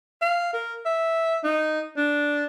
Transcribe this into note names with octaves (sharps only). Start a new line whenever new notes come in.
F5
A#4
E5
D#4
D4